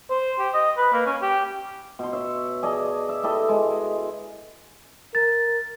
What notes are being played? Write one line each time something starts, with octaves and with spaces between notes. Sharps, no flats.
C5
G4
D#5
B4
A#3
C#4
G4
B2 C6
C#5 E5
G#4 D5 D#5 A5
E5
E4 G4 A4 D#5
G#3
A#4 A6